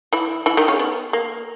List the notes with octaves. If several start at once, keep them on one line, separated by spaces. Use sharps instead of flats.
E3 E4
E3 E4
D#3 D#4
C#3 C#4
B3
A#3